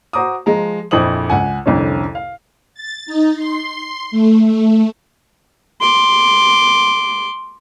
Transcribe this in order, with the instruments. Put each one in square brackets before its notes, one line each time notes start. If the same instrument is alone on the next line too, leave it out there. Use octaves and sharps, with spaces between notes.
[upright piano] F#4 C5 A#5 D6 D#6
F3 G#3 A#5
A#1 F2 E4 C5 D#6 F#7
C#2 F#5 G#5
C2 F2 D3 C#4
F5
[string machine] A6
D#4
C6
A3
A3
[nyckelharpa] C6 D6